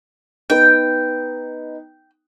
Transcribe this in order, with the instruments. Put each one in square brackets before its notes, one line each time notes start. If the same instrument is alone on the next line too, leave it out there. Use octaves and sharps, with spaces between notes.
[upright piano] B3 D#4 [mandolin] G5